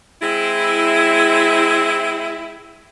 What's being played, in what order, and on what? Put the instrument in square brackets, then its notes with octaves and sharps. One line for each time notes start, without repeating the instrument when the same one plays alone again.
[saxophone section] G#3 C4 E4